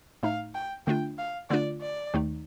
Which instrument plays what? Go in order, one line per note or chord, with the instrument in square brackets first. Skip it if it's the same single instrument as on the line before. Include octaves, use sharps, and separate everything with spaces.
[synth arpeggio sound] A2 A3 D#4 [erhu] F5
[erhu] G5
[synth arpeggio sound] D3 A3 D4 F4 [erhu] G5
[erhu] F5
[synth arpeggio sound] D3 A3 D4 F4 [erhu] D5
[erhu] D5
[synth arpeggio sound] D#2 D#3 A3 D#4